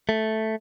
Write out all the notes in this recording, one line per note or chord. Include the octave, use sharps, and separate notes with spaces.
A3